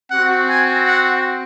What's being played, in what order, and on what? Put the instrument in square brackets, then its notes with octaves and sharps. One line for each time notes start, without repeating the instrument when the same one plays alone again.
[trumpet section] C4 F#4 F#5
G#5
F#5